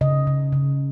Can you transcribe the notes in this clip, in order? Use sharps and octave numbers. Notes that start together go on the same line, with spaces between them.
C#3 D#5
C#3
C#3